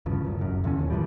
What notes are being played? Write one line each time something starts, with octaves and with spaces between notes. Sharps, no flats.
D1 G2 C#3 F3
D1 F#2
F#1 F#2
E2 A#2 D3 C#4
D#1 G#1 D#2
G2 E3 F3 G3